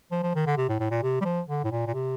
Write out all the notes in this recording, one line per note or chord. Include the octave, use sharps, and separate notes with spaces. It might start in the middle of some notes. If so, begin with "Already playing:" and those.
F3
F3
D#3
D3
C3
A2
A2
A#2
C3
G3
F3
D3
A2
A#2
A#2
C3